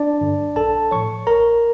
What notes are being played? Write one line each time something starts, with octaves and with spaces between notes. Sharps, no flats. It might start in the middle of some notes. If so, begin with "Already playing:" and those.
Already playing: D4 D5
G2 D3
A#1 A4 A5
A2 F3 C#5 C#6
A#1 A#4 A#5